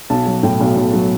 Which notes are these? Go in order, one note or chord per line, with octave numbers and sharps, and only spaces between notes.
B1 A5
F#3
A2 G5
B1
B1
F#3